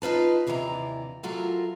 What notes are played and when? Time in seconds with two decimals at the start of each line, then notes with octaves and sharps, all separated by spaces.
0.02 D#4 F4 B4 A5
0.47 D#2 C3 E3 D4 G#5 A#5
1.23 E3 F#3 F4 A4 A#4